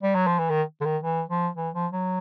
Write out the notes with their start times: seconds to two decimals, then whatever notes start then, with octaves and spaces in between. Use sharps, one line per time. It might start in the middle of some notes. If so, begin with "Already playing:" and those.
0.03 G3
0.15 F#3
0.27 F3
0.39 E3
0.50 D#3
0.81 D3
0.85 D#3
1.03 E3
1.30 F3
1.57 E3
1.74 F3
1.92 F#3